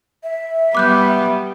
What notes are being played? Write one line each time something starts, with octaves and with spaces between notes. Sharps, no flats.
E5
G3 B3 D6 F#6 G6